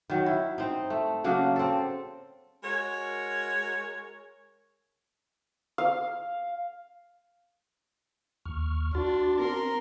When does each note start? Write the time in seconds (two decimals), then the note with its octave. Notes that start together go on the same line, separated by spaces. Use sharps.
0.10 D#3 F#3
0.26 E4
0.58 C4 D#4
0.90 A3
1.24 C#3 F#3 A#3 D4
1.56 C4 A4
2.63 G#3 F#4 A#4 C#5
5.78 F5
8.46 D#2 C#6 F6
8.95 D4 F#4 C6 A6
9.40 C4 A#4 C6